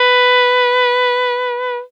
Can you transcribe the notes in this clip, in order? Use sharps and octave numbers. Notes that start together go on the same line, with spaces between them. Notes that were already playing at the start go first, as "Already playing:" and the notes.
Already playing: B4